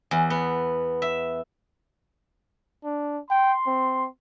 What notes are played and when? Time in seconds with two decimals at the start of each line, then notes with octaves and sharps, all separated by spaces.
0.11 E2
0.30 B3
1.02 E5
2.84 D4
3.30 G5 C6
3.67 C4